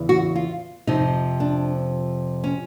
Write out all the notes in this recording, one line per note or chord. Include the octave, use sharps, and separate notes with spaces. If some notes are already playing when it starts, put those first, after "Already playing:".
Already playing: E2 C#3 E3
F#4
F4
F2 C3 F3 D#4
D4
C#4